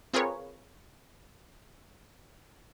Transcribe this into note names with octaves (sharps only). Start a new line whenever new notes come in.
C4 F4 G#4 A#4 B4 C#5